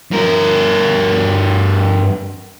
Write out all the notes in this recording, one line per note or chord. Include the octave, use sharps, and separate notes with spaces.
G2 A#4